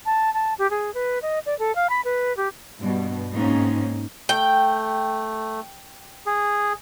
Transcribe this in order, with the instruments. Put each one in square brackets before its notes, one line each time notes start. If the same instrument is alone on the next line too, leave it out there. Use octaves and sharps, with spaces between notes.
[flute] A5
A5
G4
G#4
B4
D#5
D5
A4
F5
B5
B4
G4
[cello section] G2 B2
G#2 A#3 C4 C#4 D#4
[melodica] A3 [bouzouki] G5
[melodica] G#4